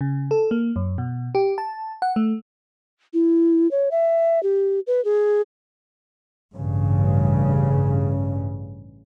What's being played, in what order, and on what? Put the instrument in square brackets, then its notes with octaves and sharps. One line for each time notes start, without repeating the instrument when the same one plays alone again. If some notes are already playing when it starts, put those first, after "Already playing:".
[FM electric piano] C#3
A4
A#3
F#2
B2
G4
A5
F#5
A3
[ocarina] E4
C#5
E5
G4
B4
G#4
[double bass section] A1 G2 C#3